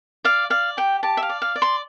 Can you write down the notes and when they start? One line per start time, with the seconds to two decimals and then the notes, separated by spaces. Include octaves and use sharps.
0.24 D5 F5
0.50 D5 F5
0.77 G4 G5
1.03 G4 A5
1.17 E5
1.23 F5
1.29 D5
1.42 F5
1.56 D5
1.62 C6